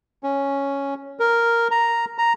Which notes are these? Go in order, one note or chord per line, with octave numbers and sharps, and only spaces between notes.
C#4
A#4
A#5
A#5